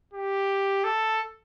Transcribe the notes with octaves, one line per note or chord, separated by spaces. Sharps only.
G4
A4